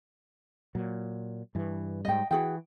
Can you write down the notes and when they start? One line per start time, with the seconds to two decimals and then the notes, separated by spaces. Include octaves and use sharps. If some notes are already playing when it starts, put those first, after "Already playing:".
0.75 A#2 F#3
1.55 G2 E3
2.05 G#2 G3 D#5 G5
2.31 E3 F#4 G#4 G5